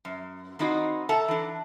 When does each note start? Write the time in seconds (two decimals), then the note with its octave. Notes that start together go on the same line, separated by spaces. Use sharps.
0.05 F#2
0.59 D#3 C4 D#4 E4 F#4 D#5
1.09 A4 E5 F#5 A5 A#5
1.28 E3 D4